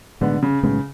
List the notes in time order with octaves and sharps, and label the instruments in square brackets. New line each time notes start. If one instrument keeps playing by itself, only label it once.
[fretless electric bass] B1 A2 G#3 B3 [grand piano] D3
[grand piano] C#3
[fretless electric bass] B1 A2 G#3 B3 [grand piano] C#3